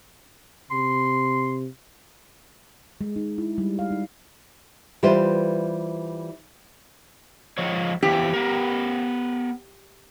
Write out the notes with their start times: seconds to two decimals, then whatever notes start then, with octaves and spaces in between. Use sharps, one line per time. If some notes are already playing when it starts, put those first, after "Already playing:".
0.71 C3 C6
3.01 G#3
3.16 D#4
3.38 E4
3.58 G3
3.79 F5
3.91 D#4
5.03 E3 G3 F4 B4 C5
7.58 F3 G#3 C#5
8.03 E3 F3 B3 G4
8.33 B3 A#4